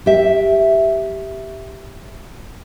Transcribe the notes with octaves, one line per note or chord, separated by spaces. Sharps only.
G4 E5